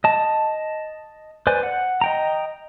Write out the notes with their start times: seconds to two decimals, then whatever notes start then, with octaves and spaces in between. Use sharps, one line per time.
0.04 D#5 A5
1.47 B4 C5 D5 G#5
1.63 F#5
2.01 D#5 G5 A#5